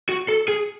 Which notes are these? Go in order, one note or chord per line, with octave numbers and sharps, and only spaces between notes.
F#4
A4
G#4